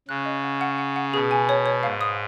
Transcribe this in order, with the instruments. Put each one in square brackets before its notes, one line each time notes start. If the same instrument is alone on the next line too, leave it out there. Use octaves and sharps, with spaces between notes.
[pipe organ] C#3 [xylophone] F#6
[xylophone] D#5
F#5
F#5
F#5
F#5
[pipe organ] B2 [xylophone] G#4
[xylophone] G#5
C#5
C#5
[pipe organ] G#2 [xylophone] F5
[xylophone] D#6